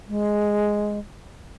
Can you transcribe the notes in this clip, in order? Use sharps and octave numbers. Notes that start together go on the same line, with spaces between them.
G#3